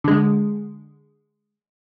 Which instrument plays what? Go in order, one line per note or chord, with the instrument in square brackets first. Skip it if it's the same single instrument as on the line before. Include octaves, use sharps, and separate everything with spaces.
[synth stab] D3 G#3